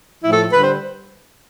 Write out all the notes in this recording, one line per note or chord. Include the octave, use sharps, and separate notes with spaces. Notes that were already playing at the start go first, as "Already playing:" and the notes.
A2 F3 E4
A4
D3 G3 B4
C5